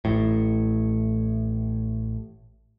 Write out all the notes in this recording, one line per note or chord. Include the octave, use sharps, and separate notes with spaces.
A1 A2